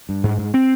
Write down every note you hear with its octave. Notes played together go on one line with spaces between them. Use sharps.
G2
G#2
G#2
C4